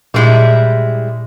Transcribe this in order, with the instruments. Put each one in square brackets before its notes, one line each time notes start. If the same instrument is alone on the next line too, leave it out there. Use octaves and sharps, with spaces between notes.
[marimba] A#2 [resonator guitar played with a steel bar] G3 G#3 E4